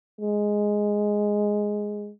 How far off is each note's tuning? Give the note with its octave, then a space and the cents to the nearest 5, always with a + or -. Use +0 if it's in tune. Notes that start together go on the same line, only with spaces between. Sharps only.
G#3 +0